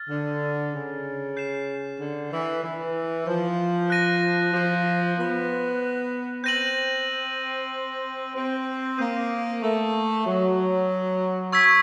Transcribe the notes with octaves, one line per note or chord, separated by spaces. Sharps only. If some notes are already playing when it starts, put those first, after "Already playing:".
Already playing: F6 A6
D3
C#3
G6 C7 E7
D3
E3
E3
F3
F#6 A#6 D#7
F3
B3
C4 G6 A#6 D#7 F#7
C4
A#3 D#6 G6 C7 D#7
A3
F#3
C#6 E6 G#6 B6